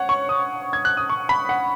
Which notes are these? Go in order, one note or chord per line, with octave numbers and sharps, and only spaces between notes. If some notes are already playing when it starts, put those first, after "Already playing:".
Already playing: C#5 F#5
C#6
D#6
G#6
F#6
D#6
C#6
B5
F#5